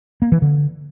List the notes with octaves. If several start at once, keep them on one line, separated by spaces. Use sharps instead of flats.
A#3
E3
D3